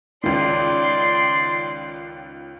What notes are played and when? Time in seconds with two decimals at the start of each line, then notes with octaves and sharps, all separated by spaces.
0.24 C#2 D#3 D5 C6